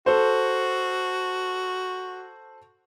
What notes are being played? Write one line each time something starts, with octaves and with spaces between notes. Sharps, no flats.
F#4 A4 C5